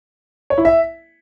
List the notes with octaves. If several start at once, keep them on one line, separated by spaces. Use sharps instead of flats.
C#5
E4
E5